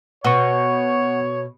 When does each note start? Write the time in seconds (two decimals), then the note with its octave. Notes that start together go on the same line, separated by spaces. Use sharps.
0.24 B2 C#5 F#5 C#6